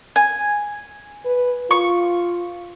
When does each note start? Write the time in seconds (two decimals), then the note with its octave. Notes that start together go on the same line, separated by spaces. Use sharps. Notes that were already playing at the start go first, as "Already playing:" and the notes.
0.16 G#5
1.26 B4
1.71 F4 C#6